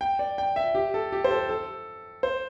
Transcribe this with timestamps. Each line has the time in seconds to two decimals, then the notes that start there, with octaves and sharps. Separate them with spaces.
0.01 G5
0.19 D5
0.38 G5
0.56 E5
0.75 G4
0.94 A4
1.12 G4
1.24 C5
1.31 A4
1.49 A4
2.23 C5